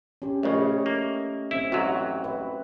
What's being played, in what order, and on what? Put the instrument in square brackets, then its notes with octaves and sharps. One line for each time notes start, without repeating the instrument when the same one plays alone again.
[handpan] C#4 G4
[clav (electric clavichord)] A#1 C#3 [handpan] A3 C#5 D#5
[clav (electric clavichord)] A#3
[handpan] C4 E5 [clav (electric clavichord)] E4
[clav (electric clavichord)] A1 G#2 F#3 [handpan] F#4
[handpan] B4